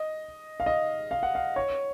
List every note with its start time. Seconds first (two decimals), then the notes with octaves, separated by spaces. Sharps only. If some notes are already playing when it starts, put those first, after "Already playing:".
Already playing: D#5
0.60 F5
0.66 D#5
1.11 F5
1.23 F#5
1.35 F5
1.56 C#5